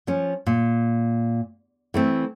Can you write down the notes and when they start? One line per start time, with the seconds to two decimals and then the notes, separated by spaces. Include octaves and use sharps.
0.07 F3 C#4
0.46 A#2
1.94 E3 A3 C4